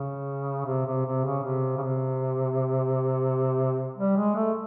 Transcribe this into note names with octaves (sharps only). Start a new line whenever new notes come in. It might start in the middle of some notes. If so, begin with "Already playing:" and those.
Already playing: C#3
C3
C3
C3
C#3
C3
C#3
C3
G3
G#3
A3